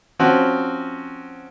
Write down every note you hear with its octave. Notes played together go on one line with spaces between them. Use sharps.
F3 C4 C#4 F#4